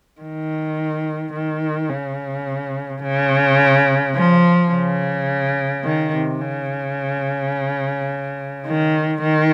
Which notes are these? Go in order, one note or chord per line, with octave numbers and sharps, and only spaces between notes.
D#3
D#3
C#3
C#3
F3
C#3
D#3
C3
C#3
D#3
D#3